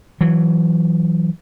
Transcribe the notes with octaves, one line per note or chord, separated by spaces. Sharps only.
E3 F#3